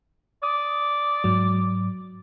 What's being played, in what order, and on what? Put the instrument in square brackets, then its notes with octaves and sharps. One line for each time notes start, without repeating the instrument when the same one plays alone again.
[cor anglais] D5 [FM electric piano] D#6
[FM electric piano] G#2 F#3